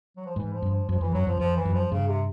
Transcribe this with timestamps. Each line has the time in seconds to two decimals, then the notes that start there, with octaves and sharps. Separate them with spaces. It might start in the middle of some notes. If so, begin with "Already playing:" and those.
0.17 F#3
0.26 F3
0.36 G#2 E3
0.53 F3
0.62 G2
0.70 F3
0.89 F#2 F3
1.01 F2 E3
1.14 F#2 F#3
1.27 F2 F3
1.39 F2 F3
1.57 E3
1.65 F#2
1.75 F3
1.92 G2 C#3
2.08 C3